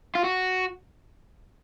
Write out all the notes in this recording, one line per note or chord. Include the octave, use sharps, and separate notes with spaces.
F4
F#4